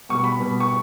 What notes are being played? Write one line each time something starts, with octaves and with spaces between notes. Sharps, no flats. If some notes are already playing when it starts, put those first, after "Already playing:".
B2 G3 B3 C#6
B5
B2 G3 B3
C#6